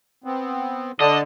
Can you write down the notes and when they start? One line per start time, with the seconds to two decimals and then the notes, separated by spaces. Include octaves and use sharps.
0.24 B3 C4
1.01 D3 D5 D#5 A5